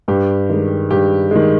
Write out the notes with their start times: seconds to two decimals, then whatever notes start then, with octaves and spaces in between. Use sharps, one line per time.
0.08 G2 G4
0.49 D#3 G#3
0.90 G2 G4
1.31 D#3 G#3